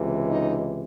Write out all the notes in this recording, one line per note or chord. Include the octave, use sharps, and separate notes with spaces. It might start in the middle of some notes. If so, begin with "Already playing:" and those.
Already playing: C#2 C3 E3
D#4